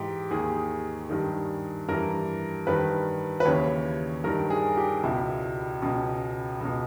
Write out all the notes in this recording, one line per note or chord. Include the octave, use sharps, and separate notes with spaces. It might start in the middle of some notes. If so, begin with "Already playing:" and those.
Already playing: G#2 E3 G4
D#2 D#3 G#4
G2 D#3
G2 E3 A#4
G2 D#3 B4
B4
D#2 C#3 E3 C#5
G2 D#3 A#4
G#4
G4
C#2 B2 E4
C#2 B2 C#4
C#2 B2